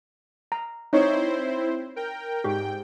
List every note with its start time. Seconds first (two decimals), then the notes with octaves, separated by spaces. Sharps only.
0.52 A#5
0.93 C4 D#4 E4 C5 C#5 C#6
1.96 A#4 G5
2.44 G#2 G4 G5